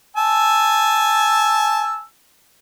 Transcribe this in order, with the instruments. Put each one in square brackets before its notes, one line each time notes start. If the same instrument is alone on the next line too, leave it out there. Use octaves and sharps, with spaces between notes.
[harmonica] G#5 A5 E6